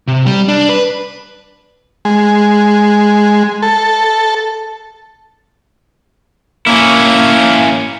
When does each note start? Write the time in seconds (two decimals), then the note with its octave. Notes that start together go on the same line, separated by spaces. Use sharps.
0.08 C3
0.26 G3
0.48 D4
0.69 B4
2.05 G#3
3.62 A4
6.67 A#3 C#4 E4